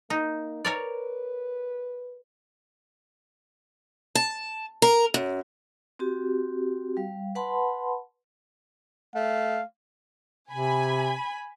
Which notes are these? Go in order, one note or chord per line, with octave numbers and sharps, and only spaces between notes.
A#3 D#4
A#4 B4 C#5 D5
A5
A#4
F#2
C4 F#4 G4
G3 F5
B4 F#5 A5 B5 C6
A3 F5
C3 G#5 B5